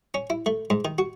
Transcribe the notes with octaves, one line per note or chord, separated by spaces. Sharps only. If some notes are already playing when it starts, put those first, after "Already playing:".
C#4
E4
A3
G#2
D#3
F#4